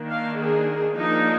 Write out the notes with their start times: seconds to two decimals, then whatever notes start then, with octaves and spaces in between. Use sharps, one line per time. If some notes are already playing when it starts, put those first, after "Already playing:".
Already playing: D#3 A#3 D4
0.11 F5
0.40 G#4
0.97 F3 A#3 D4 D#4